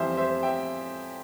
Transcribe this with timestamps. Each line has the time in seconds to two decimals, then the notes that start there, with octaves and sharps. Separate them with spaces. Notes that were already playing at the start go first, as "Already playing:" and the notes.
Already playing: F2 E3 G3 C5 E5
0.17 C5 E5
0.43 E5 G5